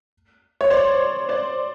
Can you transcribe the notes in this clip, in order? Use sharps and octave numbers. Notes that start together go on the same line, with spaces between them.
C#5
C5 D5
C5 D5